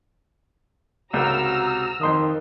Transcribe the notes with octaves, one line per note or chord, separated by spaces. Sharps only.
C#2 G#2 C3 F#4 A#4 A#5 E6 F6
F2 D#3 C6 D#6